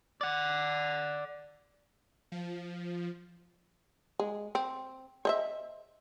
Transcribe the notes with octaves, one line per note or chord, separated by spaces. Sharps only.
D5 F#5
F3
G#3
C4
C5 D#5 E5